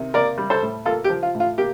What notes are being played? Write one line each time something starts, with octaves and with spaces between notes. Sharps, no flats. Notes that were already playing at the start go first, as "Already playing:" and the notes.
Already playing: C3 D#3
A#3 A#4 D5
G3
A4 C5
A2
A#3 F4 A4
G4
F3
F4
A2
F4
A#3 G4